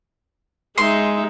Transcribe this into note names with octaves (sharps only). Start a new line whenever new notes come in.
G#3 D#4 E5 C6